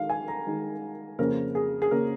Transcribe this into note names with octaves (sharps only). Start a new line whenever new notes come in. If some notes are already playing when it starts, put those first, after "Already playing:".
Already playing: D#3 G#3 D#4 F5
G#5
A#5
D#3 G#3 D#4
F2 C#3 A#3 C#4 A#4
G#4
G#4
C#3 A#3 C#4 A#4